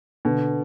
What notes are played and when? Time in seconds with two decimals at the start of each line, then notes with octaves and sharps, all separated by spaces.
0.25 B2 D3